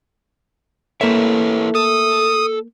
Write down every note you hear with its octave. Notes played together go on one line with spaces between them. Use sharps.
A3 A#3 E4 B4 C#5 E5
A4 D#6